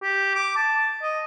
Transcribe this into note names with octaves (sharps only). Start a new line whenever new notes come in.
G4
D6
A5
D#5